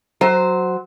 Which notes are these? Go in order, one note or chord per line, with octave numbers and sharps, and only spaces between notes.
F#3 C5